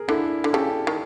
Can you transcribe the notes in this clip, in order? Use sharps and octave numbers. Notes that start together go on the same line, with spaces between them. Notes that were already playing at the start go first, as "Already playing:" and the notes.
Already playing: G#4 A#4
D3 D4 E4
D3
C#3 G4 A4
D#3